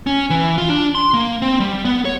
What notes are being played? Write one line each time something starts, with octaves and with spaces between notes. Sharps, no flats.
C#4
E3
F4
D4
C6
A#3
C4
G3
B3
C#5